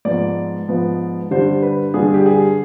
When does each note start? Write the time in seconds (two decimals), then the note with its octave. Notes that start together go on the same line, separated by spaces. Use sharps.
0.05 G#2 F3 B3 D5
0.68 G#2 F3 B3
1.31 G2 D3 G3 D4 C5
1.62 B4
1.94 G2 D3 G3 D4 G#4
2.14 G4
2.26 G#4